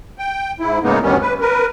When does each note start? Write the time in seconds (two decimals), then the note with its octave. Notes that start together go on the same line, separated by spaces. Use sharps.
0.18 G5
0.60 G#2 E4
0.83 A2 C#3 G#3 A#3 B3 D#4
1.02 D2 G2 D#3 G3 B3 C#4
1.22 B4
1.41 A#4 B4